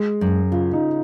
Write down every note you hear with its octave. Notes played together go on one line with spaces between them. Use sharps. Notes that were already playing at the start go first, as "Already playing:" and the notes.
Already playing: G#3 G#4
F#2
C#3 F4
D#4